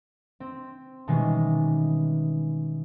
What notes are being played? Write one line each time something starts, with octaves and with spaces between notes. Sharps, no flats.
C4
B2 D#3 E3 G3 G#3 C#4